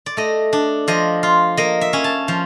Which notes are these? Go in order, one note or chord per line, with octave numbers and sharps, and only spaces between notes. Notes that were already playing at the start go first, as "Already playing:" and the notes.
D5
A3 D#5
D4
F3 D#5
F4
A#3 D#5
E5
C#4
A5
F3